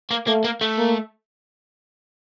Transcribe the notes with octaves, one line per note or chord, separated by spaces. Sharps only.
A#3
A3 A#3
A#3
A3
A#3